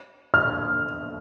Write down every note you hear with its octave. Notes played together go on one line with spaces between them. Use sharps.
F6